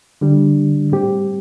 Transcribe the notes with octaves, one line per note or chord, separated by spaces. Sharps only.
D3 G3 D4
A2 G3 C4 G4